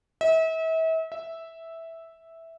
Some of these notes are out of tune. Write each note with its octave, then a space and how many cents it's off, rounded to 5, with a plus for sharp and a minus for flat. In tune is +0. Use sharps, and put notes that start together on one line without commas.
E5 -35
E5 -5